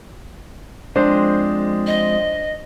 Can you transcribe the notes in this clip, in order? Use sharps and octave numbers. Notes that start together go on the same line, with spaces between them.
F3 G#3 C4 D4 C5
D#5